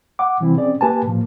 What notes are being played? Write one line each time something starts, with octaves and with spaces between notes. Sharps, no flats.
F#5 D6
C3 E3 G3 C4 E4
C4 C#4 G#4 D5
A#3 G4 B4 G#5 A5
A2 F3 A#3